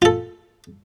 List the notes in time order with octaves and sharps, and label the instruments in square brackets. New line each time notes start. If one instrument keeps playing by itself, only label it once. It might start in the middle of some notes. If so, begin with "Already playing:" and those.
[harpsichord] F4 A4